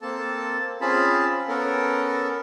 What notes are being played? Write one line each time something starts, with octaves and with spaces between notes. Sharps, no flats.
A#3 C4 A4 A5
C4 C#4 F4 G#4 A5 B5
B3 C#4 A4 A#4